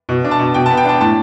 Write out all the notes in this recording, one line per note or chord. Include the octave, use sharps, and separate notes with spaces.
B2
D4
A5
B2
B2 G5
A5
B3
G5
D4 A5
A2 A5